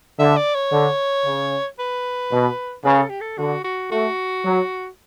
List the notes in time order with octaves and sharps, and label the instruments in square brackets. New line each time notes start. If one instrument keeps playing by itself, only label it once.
[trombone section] D3 [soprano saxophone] E5
[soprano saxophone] D5
C#5
[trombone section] D3
C#3
[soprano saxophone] B4
[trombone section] B2
[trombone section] C#3 [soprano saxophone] B4
[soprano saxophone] A4
G4
A4
[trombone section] D3 [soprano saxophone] F#4
[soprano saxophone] F#4
[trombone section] A3 [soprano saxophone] F#4
[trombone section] F#3